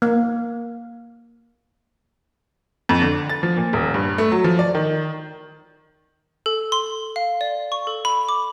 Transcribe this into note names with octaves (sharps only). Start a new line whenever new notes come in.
A#3
F2
D3
A6
F3
A#2
D#1
G2
A3
F#3
F3
D5
D#3
A4
C6
F5
D5
C#6
A4
B5
D6